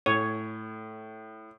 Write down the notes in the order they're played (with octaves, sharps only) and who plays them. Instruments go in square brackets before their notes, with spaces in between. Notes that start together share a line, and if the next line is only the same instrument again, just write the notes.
[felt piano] A2 [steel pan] C#5